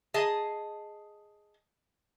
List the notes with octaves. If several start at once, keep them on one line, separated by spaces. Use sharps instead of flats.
G#4 D#5 A5